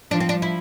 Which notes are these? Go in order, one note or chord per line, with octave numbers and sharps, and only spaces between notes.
F3 D4
C4
D4
E4